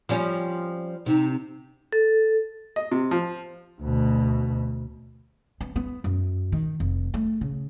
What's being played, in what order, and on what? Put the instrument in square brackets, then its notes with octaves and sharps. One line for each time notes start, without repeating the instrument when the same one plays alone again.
[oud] F3 G3 C#4
[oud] C3 [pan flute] D#4
[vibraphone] A4
[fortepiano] D#5
C3
F3
[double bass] D2 B2
[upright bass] B3
B3
F#2
D#3
F1
A3
C#3